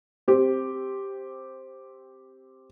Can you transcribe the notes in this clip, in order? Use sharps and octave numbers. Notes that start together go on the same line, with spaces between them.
C4 G4